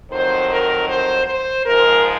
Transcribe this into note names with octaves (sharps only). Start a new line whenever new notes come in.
F2 D#3 F#3 C5
A#4
C5
C5
G#2 F3 G#3 A#4